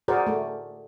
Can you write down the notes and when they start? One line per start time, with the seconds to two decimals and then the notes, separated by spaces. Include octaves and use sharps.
0.08 F#4 G#4 A#4 C5 D5
0.27 A3